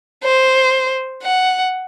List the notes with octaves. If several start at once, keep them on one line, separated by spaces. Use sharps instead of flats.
C5
F#5